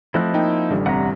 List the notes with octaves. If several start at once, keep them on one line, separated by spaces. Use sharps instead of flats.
F3 A3 C4 E4 D#5 F#6
A#3 D#4 G5
A1 D3 G3
C2 F#5 A#5